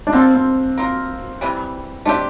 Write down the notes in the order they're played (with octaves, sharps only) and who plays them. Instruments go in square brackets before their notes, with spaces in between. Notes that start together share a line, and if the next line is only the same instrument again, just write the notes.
[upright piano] D4
[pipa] A#3 F4 A4 [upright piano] C4
[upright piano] C4
[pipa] A#3 F4 A#4
C3 E3 G3
[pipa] A3 C4 G4 [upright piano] D4